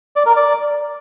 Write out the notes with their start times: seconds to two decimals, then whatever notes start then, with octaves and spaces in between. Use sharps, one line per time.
0.16 D5
0.26 A#4
0.36 D5